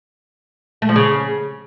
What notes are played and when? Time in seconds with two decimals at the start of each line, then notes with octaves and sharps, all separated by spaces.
0.82 A3
0.89 F3
0.96 C#3